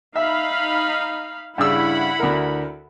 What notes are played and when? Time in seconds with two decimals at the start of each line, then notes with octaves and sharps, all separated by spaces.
0.16 D#4 E5 F5 B5
1.58 G2 C#3 E4 F#5 B5 E6
2.19 D2 A#4